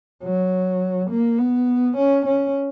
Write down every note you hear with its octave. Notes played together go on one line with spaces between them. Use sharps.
F#3
A#3
B3
C#4
C#4